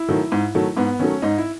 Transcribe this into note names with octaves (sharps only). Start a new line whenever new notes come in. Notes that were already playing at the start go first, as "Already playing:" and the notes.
Already playing: E4
D#3 F#3 A3
G#2
D#3 F#3 A3
G#2 B3
D#3 F#3 A3 C#4
G#2 D#4
E4